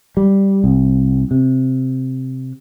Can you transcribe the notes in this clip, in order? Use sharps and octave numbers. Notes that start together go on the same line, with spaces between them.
G3
C2
C3